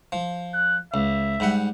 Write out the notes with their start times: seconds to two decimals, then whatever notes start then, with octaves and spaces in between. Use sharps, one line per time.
0.12 F3
0.54 F#6
0.94 C#2 E5
1.40 G#2 G3 F#5